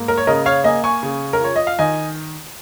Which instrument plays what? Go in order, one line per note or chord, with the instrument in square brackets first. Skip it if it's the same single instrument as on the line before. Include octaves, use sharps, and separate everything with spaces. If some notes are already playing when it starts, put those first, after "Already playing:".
Already playing: [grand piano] G#2 A#3
A#4
C#5
C#3 A#4 D#5
C#5 F5
A#3 D#5 G#5
G#5 C#6
C#3
A#4
F4 C#5
D#5
F5
D#3 D#5 G#5